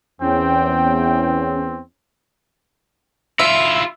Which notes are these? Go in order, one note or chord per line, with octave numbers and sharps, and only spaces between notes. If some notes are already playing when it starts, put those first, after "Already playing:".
E2 C4 C#4 G5
E4 F4 E5